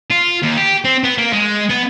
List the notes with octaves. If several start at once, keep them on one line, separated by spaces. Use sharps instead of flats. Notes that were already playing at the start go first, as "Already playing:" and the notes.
F4
D#2
G4
C4
B3
A#3
G#3
B3